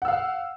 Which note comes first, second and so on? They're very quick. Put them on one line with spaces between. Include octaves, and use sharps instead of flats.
F#5 E6 F5